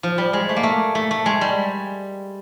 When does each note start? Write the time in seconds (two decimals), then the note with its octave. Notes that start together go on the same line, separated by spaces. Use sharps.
0.03 F3
0.18 G3
0.33 G#3
0.49 A3
0.56 A#3
0.63 A3
0.95 A3
1.11 A3
1.26 G#3
1.41 G3